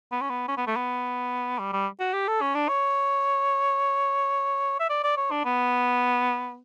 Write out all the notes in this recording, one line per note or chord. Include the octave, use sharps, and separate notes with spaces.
B3
C#4
B3
C#4
B3
A3
B3
G3
G3
F#4
G4
A4
C#4
D4
C#5
E5
D5
D5
C#5
D4
B3